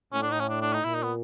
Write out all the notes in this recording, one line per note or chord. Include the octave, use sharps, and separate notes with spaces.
A2 C#4
D4
D#4
C#4
D4
D4
D#4
A#2 E4
D#4
B3